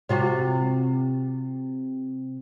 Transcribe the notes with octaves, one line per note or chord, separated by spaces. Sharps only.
C3 F4 F#4